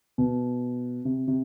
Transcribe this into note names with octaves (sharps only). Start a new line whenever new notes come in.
B2
C3
C3